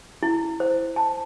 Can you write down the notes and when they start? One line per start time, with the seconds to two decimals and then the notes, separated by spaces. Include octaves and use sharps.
0.23 E4
0.60 C5
0.96 A5